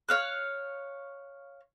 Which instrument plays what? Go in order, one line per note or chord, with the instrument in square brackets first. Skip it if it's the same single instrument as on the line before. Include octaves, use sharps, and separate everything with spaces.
[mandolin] C#5 F5 F#6